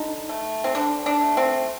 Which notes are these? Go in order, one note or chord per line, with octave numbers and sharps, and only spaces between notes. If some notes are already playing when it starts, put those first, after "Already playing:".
Already playing: D3 D#4
A3
C4
D3 D4
D4
A3
C4